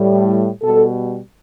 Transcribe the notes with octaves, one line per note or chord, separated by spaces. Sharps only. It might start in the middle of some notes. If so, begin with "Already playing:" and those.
Already playing: A2 G3
B2 G3 A4